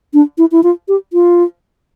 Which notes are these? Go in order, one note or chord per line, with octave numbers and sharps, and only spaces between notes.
D4
E4
E4
F4
G4
F4